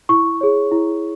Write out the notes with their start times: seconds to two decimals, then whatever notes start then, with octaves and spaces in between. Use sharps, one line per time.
0.09 E4 C#6
0.41 G#4 C#5
0.71 E4